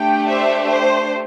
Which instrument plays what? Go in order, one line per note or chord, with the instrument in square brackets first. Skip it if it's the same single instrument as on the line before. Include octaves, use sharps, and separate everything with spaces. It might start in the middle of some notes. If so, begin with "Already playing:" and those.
Already playing: [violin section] A3 D4 G4 G5
C5 E5
C5